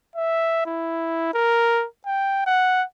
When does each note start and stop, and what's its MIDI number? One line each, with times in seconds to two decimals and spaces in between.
0.16 0.63 76
0.66 1.33 64
1.34 1.85 70
2.06 2.46 79
2.46 2.83 78